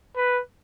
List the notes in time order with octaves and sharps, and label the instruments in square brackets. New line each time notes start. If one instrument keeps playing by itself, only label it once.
[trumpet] B4